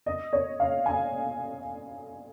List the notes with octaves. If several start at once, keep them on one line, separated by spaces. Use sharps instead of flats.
D#5
C#5
F5
G#5